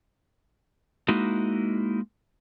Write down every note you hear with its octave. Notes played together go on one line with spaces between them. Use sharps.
G#3 A#3 D#4 E4 F#4